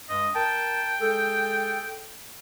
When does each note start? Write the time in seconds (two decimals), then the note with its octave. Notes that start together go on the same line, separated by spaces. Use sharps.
0.10 G2 G#3 D#5
0.36 A#4 G5 A5
1.01 G#3 G#4 A4